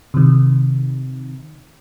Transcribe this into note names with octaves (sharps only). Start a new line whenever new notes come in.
C3 D#3